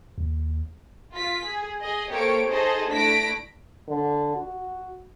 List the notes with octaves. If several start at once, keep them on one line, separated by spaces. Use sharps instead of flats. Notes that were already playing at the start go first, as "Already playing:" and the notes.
D#2
F4 B6
G#4
G#4 D#5
A#3 G4 A4 C5 C#5 D7
D#4 G#4 A4 C5 D#5 A5
A3 D4 E4 A#6 B6 D7
D3
F#4